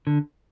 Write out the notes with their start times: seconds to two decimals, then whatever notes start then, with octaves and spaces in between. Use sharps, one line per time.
0.07 D3